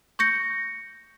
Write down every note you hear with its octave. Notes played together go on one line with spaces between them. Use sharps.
C#6 G6 A#6 C#7